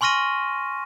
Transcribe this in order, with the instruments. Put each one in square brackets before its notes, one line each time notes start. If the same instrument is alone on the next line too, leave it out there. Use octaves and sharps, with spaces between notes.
[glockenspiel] G#5 C6 C#6 F6 A#6 D#7